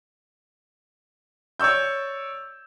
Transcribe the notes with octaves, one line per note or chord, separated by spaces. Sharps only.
C#5 D5 C#6 E6 G6